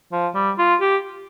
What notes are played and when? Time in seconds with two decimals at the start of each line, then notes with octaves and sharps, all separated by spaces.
0.12 F3
0.35 G3
0.59 F4
0.81 G4